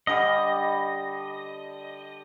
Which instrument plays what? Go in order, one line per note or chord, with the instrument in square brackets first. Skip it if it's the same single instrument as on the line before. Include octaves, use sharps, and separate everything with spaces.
[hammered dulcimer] D3 G3 [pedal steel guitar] D#5